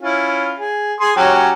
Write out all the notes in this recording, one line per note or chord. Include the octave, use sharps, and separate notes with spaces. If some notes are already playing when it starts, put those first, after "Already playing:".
C#4 E4 F4
G#4
G#4 C6 D#6
F#3 C#4 G4